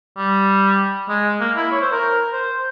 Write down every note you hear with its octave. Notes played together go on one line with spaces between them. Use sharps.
G3
G#3
A#3
E4
C#5
C5
A#4
C5